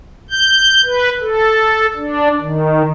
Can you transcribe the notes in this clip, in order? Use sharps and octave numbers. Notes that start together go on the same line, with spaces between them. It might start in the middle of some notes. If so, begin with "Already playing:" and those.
G6
B4
A4
D4
D#3